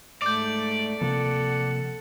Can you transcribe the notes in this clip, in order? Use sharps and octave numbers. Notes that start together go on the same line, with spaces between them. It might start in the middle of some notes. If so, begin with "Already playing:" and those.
G#2 A3 D5 D6 G6
C3 F3 A#3 A4 F#5